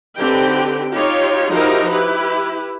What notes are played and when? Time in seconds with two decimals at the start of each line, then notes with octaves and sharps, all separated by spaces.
0.18 D3 C4 D#4 G4 B4 G5
0.93 D#4 F4 G4 C#5
1.50 F3 D#4 E4 F#4 G4 A#4
1.90 E4 G4 B4